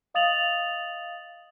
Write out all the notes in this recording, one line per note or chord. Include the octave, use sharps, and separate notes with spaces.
D#5 F5 D#6 A6 F7 F#7